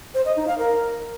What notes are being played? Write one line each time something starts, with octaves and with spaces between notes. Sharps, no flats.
C5
D#5
D#4
F5
A#4